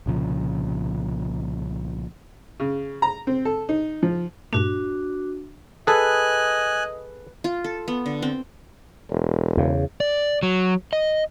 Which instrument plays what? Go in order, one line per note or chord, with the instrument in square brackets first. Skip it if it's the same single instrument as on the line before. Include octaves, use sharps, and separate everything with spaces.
[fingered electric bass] C2 A#2 C#3 F3
[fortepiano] C#3
A#5
C4
A4
D#4
F3
[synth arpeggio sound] G2 A#2 A3 [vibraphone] D4 F#4
[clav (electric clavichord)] G#4 A4 [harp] B4 [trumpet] D#5 [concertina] G#5 F#6
[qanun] F4
A4
B3
D3
C4
[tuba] E1
[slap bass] E2 C#3
[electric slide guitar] D5
F#3
D#5